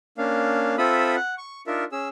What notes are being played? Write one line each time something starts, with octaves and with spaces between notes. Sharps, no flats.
A#3 C#4 D4 F5
C4 F4 A4 E5 B5 D#6
F#5
C#6
D4 D#4 F4 A#4 E5
C#4 G#4 E6